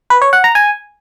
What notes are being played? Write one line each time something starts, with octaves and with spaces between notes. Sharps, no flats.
B4
C#5
F#5
A#5
G#5